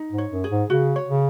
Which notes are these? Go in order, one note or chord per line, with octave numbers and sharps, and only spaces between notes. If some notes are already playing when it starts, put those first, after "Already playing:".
Already playing: D#4
G#2
C#5
F#2
G#4
G#2
C#3 F#4
C#5
C#3